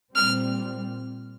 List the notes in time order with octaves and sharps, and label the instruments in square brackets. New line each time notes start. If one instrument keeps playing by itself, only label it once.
[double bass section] A#2 G3 C4 [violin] F6